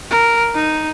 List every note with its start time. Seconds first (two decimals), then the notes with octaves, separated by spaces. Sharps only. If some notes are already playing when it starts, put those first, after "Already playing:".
0.11 A#4
0.55 D#4